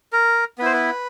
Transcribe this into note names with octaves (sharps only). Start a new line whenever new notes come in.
A#4
B3 E4 B4 C5
B4